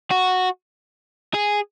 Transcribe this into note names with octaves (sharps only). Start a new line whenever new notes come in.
F#4
G#4